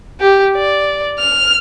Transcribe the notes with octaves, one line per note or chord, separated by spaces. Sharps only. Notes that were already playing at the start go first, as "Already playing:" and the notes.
G4
D5
F6